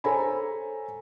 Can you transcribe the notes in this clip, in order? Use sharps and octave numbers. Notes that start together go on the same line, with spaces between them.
A4 C5 C#5 G#5 A#5 B5